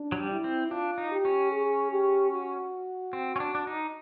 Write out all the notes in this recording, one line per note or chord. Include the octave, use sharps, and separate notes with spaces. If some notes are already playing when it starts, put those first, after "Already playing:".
Already playing: D4
F#3
G3
E4
C4
D4 F4
D#4
G4
C#4
G#4
G4
F#4
C4
C#4
D4
D4
D#4